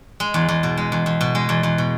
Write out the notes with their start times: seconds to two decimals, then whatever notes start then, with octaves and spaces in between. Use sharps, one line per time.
0.20 G#3
0.34 E2
0.49 E2
0.63 B2
0.77 G#3
0.92 E2
1.06 E2
1.21 B2
1.35 G#3
1.49 E2
1.63 E2
1.78 B2